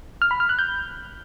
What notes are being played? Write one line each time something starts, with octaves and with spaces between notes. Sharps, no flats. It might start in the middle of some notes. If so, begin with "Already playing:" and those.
F6
B5
F6
F#6
G6